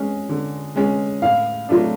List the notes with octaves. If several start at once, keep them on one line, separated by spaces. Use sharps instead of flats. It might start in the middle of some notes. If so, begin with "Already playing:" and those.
Already playing: G#3 C#4
D3
G#3 C#4
A2 F5
F#3 A3 D4